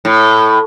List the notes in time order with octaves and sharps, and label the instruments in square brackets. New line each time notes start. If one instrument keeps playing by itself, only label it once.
[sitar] A2